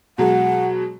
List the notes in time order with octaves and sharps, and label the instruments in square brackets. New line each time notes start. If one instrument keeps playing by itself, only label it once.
[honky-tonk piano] B2 F#3 G#3 [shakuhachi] F#5